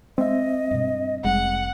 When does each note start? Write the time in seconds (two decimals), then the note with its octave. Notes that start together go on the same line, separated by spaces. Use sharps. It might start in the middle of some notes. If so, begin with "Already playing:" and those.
0.18 G#3 C4 D#5 E5
0.71 G2 B2
1.25 F1 G3 G#3 C4 F#5